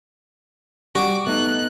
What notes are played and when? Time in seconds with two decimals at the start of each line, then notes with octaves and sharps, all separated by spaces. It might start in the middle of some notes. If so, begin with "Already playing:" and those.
0.95 G3 F#4 D6
1.27 A3 B3 D#4 F#6